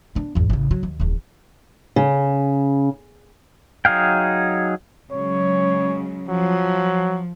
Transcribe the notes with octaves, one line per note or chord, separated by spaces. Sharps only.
B3 D4
G#1 E2
A1 C#3
F#3
D#2
D#1 E2
C#3
F#3 D#4 G#4 F5 G5
C#3 F#3 G#3 C#5
F3 F#3